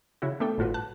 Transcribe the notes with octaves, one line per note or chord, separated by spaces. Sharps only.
C#3 E4 F#4
A3 B3 D4 A4 G5
G1 A2 F4 F#4 B4
A5 F#6